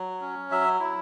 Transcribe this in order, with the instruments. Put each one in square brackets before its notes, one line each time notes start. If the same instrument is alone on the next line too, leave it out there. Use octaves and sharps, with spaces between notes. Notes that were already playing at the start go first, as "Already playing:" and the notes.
Already playing: [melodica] F#3
C#4
F#3 E5
E4